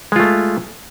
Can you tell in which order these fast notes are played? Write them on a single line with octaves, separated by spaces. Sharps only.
G#3 F4 A3